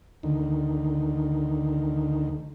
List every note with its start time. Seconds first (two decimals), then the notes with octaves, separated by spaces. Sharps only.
0.23 D2 D#3